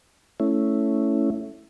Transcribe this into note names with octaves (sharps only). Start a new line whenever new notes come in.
A3 C#4 E4